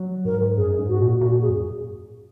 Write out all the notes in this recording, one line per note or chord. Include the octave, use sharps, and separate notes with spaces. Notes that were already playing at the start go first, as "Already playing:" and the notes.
Already playing: F#3
G#2 A#4
F#2 G#4
G#2
F#4
A#2
A#2 F#4
G#4
F#2